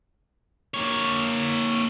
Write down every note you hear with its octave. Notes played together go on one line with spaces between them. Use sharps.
A#3 C#5